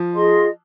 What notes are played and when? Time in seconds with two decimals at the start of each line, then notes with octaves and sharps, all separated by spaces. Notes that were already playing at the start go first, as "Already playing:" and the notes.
Already playing: F3
0.12 F4 G#4 D#5 C6